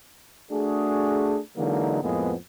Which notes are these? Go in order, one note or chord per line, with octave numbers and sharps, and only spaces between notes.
A3 D4 F#4 G#4
D3 E3 F#3 G#3 A#3 D#4
F2 A2 G#3 A#3 B3